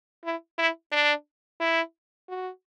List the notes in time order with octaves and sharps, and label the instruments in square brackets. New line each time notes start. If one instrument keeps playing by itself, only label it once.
[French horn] E4
E4
D4
E4
F#4